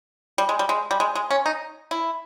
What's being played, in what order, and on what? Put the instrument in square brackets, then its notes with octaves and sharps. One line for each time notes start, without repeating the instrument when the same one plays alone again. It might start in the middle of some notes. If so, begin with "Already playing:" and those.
[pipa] G3
G#3
G3
G#3
G3
G#3
G#3
C#4
D#4
E4